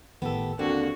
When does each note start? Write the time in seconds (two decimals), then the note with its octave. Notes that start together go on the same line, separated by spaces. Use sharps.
0.22 G1 A2 D#3 B3 G4 A4
0.59 D#2 D3 A#3 C4 F#4